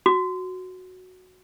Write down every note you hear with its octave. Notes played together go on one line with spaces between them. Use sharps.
F#4